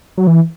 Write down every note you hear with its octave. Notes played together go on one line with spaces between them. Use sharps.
F#3
E3